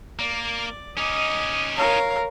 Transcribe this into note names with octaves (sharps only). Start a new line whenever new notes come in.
A#3 D5
C#4 D#4 D#5 D6
A#4 C#5 F5